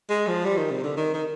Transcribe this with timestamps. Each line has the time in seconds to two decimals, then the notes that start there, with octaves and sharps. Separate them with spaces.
0.10 G#3
0.28 F3
0.45 G3
0.58 D#3
0.71 C3
0.84 D3
0.97 D#3
1.14 D#3